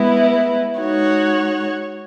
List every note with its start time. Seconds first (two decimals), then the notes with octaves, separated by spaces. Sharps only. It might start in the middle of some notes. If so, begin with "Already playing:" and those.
Already playing: G#3 B3 E4 B4
0.78 G#3 D#4 F#4 C#5